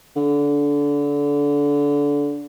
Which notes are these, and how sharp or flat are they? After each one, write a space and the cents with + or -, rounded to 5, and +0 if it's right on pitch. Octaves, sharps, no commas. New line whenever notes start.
D3 -25